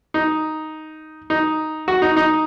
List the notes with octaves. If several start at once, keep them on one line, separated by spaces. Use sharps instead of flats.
D#4
D#4
F#4
D#4
D#4